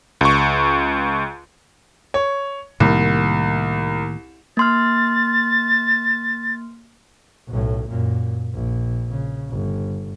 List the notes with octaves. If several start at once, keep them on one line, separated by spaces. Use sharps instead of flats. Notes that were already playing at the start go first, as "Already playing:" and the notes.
C#2 C#6
C#5
C2 A2 D#3 A#3
A#3 C6 F6 A6
B1 A2
F#2 A#2
A#1
C#3
G1